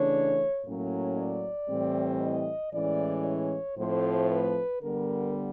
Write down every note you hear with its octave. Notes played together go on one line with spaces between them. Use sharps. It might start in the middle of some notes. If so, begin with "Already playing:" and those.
Already playing: C#3 E3 A3 D4 C#5
A2 F#3 A#3 C#4
D5
A2 E3 G3 C4
D#5
A2 E3 G#3 C#4 D5
C#5
A2 F3 A3 C4 C5
B4
D3 G3 B3 A#4